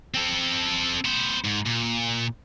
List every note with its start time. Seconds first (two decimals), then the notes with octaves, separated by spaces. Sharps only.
0.14 C4 A4
1.05 B3 C5
1.44 G#2
1.66 A#2